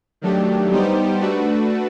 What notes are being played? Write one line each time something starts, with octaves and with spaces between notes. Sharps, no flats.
D#3 F#3 A3 D4 G4
G3 B3 D#4 G4 C5
A3 D4 F#4 B4